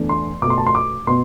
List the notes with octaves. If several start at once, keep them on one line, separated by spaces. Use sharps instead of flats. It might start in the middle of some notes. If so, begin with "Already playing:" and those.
Already playing: E2 D3 A3
C6
B2 A3 C6 D6
A5
C6
D6
B2 B3 C6